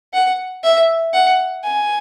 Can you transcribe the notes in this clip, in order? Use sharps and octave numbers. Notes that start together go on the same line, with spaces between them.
F#5
E5
F#5
G#5